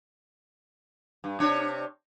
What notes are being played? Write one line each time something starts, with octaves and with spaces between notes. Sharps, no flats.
G2
C3 D4 C#5